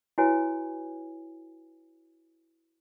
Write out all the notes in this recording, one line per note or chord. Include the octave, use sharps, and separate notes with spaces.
E4 F#4 B4 C#5 G#5